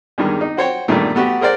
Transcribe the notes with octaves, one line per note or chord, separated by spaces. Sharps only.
E2 G2 D#3 G#3
D#4
F#4 C5 C#5 G5
E2 G2 A#2 D#3 A3
A3 B3 F#4 G4
G#4 A#4 C5 D5 F#5